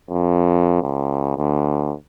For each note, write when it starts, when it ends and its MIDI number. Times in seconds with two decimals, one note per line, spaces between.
0.10 0.82 41
0.82 1.36 37
1.37 1.93 38